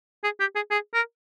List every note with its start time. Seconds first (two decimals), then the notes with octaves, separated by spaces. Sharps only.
0.24 G#4
0.40 G4
0.55 G#4
0.70 G#4
0.94 A#4